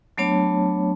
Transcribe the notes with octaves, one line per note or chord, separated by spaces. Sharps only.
F#3 A3 B3 D4 C#5 A5